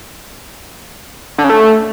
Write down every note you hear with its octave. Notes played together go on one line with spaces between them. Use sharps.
D3
C#3
A3